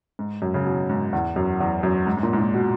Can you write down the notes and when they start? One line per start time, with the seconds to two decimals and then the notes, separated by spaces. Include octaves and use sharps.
0.19 G#2
0.42 F#2
0.54 C#3
0.65 B2
0.90 G#2
1.13 E2
1.36 F#2
1.60 E2
1.83 F#2
2.07 G#2
2.17 G#2
2.23 A#2
2.33 G#2
2.38 A#2
2.54 B2